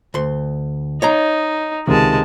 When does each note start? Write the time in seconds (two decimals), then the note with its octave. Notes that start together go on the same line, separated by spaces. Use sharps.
0.14 D2 C6
1.02 D#4 C#5 D#5 A#5
1.87 C#2 C3 D#3 G#3 A5